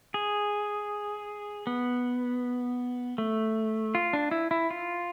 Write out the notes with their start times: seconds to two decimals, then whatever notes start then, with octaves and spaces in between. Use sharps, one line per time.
0.14 G#4
1.67 B3
3.18 A3
3.95 F4
4.13 D4
4.31 E4
4.51 E4
4.70 F4